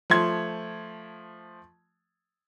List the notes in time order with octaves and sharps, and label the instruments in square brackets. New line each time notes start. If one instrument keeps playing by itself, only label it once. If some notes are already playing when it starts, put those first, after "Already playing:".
[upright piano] F3 A3 C6 G#6